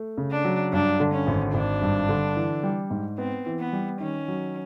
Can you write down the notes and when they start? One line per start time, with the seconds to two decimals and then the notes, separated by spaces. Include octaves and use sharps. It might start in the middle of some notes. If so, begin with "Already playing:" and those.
Already playing: A3
0.18 C#3
0.31 D4
0.45 F#3
0.73 G2 D4
1.00 D3
1.13 C#4
1.27 G#1
1.54 G#1 D4
1.82 G2
2.09 D3
2.36 E3
2.63 G3
2.90 G#2
3.18 B3 C4
3.46 E3
3.60 B3
3.73 G3
4.00 D#3 C#4
4.28 F#3